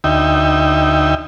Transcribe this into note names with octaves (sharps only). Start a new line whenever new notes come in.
D2 D#4 E5 G5